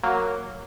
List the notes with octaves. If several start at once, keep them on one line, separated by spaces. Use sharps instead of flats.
F#3 A#3